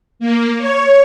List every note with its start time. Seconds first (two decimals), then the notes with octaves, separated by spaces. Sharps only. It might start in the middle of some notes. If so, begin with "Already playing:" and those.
0.19 A#3
0.58 C#5